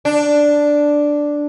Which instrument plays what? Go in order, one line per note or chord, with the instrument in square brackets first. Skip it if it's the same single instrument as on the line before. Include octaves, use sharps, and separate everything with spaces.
[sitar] D4